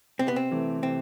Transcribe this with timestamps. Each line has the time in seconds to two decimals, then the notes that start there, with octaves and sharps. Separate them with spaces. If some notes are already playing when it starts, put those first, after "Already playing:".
0.19 C3 C4
0.28 B3
0.36 C4
0.51 E3 A3
0.83 C3 C4